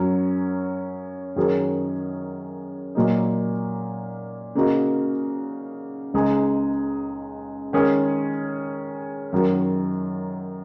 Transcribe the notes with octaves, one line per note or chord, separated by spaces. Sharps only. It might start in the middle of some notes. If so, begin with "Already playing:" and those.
Already playing: F#2 F#3 C#4
F#2 D#3 F#3 C#4 G#4
A#2 F#3 A#3 D#4
C#3 A#3 D#4 F#4
C#2 C#3 G#3 D#4 G#4
D#3 G#3 C#4 G#4
F#2 D#3 F#3